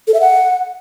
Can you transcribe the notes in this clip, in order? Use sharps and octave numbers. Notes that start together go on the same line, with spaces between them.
A4
E5
F#5